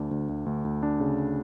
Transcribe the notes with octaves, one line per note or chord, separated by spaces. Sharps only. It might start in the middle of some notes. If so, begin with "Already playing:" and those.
Already playing: D2 D4
D2
D2
D2
D2
D4
C#3